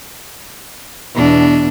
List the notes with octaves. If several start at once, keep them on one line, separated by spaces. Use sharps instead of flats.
E2 B2 D4